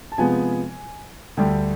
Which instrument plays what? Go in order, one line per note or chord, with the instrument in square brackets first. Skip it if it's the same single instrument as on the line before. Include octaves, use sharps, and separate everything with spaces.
[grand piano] A5
C3 F3 G#3 B3 G#5
D2 D3 G3 G5